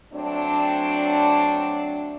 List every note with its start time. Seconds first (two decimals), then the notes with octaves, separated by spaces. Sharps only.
0.12 F#3 A3 C4 D4